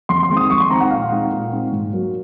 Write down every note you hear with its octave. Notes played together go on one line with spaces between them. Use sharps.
F2 C6
C6
D#3 G#3 C4 D#4
D#6
F2 C#6
C6
D#3 G#3 C4 D#4 A#5
F#5
A#2 F5
G#3 C4 D#4
A#2
G#3 C4 D#4
G#2
F#3 A#3